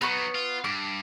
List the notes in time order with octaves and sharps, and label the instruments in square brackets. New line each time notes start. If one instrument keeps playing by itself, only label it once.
[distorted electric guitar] F#3 D#4 [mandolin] B3 C#6
[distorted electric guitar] F4
[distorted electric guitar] G2 [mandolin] D6